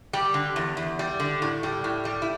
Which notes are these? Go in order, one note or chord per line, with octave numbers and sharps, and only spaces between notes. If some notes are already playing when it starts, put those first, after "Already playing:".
G3 G4
D3
E2
E2
G3
D3
A2
G3
A2
G3
E4